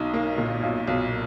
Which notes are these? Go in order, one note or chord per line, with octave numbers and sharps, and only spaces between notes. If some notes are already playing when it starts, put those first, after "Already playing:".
Already playing: B1 D#4
A#3
A#2
B1
B1